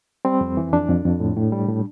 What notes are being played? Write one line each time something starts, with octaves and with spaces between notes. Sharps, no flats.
G3 C4
F2
E3
F2 D4
F2
F2
A2
A2
G3
A2